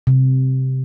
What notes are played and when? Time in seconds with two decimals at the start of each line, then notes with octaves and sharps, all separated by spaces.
0.07 C3